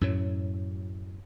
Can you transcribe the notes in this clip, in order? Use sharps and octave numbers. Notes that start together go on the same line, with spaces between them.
F#2 A2 F#3